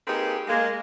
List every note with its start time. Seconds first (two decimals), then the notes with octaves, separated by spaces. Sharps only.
0.07 A#3 C4 D#4 G4 G#4 B4
0.47 G#3 A#3